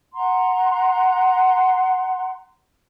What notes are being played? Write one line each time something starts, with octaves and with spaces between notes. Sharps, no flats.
F#5 A#5 C6